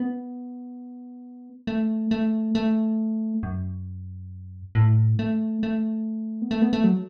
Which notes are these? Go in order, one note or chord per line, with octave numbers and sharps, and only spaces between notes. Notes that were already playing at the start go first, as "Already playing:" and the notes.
Already playing: B3
A3
A3
A3
F#2
A2
A3
A3
B3
A3
B3
A3
F#3